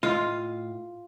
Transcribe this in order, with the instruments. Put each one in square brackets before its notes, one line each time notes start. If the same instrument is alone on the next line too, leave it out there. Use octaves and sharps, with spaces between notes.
[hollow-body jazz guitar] A2 D#5 [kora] F4